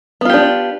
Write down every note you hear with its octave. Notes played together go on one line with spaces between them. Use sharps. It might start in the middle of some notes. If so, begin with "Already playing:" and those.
B3 D4 F4 G4